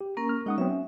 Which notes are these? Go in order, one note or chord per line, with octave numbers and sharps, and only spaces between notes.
G4
A#3 C#4 A#4 A#5
F6
G#3 C#4 D#4 F#5 D#6
F#3 B3 C4 E5
C#4